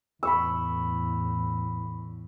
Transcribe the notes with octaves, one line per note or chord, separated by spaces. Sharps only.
E2 A2 B5 C#6 E6